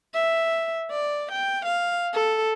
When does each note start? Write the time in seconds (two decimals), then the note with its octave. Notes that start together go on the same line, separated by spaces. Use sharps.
0.14 E5
0.91 D5
1.32 G5
1.66 F5
2.13 A4